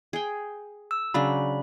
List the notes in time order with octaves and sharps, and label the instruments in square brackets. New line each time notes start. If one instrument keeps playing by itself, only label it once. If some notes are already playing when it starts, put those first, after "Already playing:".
[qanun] G#4 G5
[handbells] E6
[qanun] C#3 F#3 D4 [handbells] B5